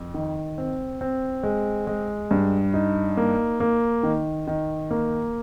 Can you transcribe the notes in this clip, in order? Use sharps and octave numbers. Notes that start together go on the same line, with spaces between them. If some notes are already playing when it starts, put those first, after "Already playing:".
Already playing: F2
D#3
C4
C4
G#3
G#3
G2
D#4
A#3
A#3
D#3
D#3
A#3